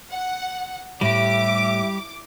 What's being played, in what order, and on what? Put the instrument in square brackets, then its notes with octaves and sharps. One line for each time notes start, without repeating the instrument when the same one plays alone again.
[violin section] F#5
[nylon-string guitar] A2 [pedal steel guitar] G3 G4 [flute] E5 [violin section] D6